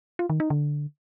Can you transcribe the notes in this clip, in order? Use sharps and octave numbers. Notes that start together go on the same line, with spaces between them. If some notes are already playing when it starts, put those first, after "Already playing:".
F4
D#3
D#4
D3